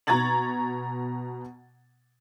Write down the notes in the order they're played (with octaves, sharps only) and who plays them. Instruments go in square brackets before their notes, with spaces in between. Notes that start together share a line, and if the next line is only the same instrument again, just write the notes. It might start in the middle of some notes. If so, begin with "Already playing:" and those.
[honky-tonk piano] B2 A#5 C#6 G#6 A6 F#7